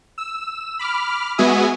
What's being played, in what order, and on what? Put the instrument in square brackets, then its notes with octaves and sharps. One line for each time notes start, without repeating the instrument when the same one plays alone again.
[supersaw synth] E6
B5 D6 F6
G#3 B3 F#4 E5 G#5 D#6